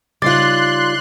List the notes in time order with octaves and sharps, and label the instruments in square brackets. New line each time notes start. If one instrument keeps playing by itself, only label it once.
[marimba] C#3 [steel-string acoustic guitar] G3 D#4 F4 [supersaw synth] C6 F#6 [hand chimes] D6 A6